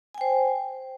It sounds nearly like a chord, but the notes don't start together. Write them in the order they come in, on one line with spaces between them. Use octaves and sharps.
G#5 G5 C5